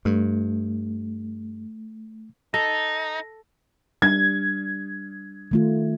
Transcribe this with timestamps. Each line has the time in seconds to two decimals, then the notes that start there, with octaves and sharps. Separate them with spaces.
0.05 G2 A3
2.54 D#4 A4 A#6
4.02 G3 D4 G#6
5.51 D#3 A3 F4